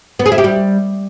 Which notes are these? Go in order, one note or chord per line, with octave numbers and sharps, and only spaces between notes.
B3
G#4
E4
G4
G3